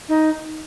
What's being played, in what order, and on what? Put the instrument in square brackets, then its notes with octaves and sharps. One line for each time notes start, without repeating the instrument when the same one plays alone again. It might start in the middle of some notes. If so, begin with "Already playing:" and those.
[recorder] D#4